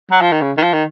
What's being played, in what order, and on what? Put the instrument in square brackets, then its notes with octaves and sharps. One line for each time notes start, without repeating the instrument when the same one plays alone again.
[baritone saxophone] F#3
F3
D#3
C#3
D#3
F3
D#3